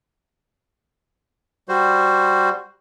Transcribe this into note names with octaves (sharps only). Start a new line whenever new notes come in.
G3 F#4 C5